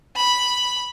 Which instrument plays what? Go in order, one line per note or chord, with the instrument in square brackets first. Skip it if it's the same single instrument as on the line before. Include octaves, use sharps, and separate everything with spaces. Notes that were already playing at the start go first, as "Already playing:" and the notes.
[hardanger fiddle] B5